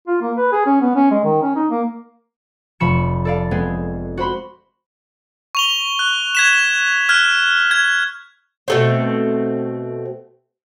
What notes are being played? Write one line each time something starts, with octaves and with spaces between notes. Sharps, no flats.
F4
A#3
B4
G#4
C#4
B3
C#4
G#3
D#3
C#4
D#4
A#3
F1 F3 B5 C#6 C#7 E7
A4 D5 F5
G#3 B3 C4 G#4
F#4 C5 B5 C6
C#6 F7 G7
F#6
G#6 B6 E7
F6 F#6 G#6
G#6
B2 A3 C4